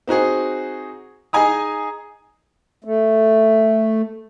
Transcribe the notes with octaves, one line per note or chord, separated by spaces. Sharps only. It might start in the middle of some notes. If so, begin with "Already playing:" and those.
C4 D#4 F#4 G#4
D#4 G#4 D#5 G#5 A#5 D#6
A3